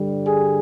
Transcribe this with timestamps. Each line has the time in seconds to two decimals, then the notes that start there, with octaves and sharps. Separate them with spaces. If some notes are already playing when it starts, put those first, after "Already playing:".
Already playing: G2 D3 G3
0.26 G#4